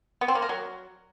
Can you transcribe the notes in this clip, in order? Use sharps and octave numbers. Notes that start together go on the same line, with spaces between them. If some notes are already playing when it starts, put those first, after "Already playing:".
B3
C4
A#3
A#4
F#3